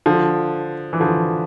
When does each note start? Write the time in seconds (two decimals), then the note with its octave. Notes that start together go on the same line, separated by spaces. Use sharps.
0.06 D3 F3
0.93 E3
1.00 D3 F3